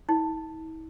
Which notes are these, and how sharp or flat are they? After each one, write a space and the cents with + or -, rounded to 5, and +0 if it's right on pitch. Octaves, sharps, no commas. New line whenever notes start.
E4 -45